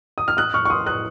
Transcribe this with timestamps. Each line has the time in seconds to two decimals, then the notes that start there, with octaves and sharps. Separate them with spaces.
0.18 D#6
0.28 F6
0.37 D#6 F#6
0.54 C#6 F6
0.65 C#6
0.70 C6 D#6
0.86 D#6 F#6